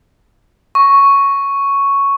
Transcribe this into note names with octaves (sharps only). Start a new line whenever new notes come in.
C#6